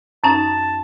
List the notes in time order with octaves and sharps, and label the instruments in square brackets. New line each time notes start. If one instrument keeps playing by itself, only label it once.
[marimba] F#2 C#4 D#4 [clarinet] A5